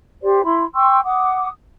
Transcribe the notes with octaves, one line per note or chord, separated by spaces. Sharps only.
G4 C5 D5
E4 B5 C6
G5 C6 C#6 E6
F#5 D6 D#6